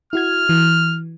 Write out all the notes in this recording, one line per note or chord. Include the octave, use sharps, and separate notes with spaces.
E4 F#4 F6 G#6
E3